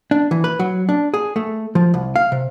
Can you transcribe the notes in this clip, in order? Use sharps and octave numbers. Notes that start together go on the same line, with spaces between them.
D4
E3
B4
F#3
D4
G#4
A3
F3
C2
F5
C3